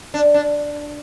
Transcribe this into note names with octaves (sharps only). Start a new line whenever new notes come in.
D4
D4